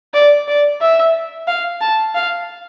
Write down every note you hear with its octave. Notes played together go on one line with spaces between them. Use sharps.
D5
D5
E5
F5
A5
F5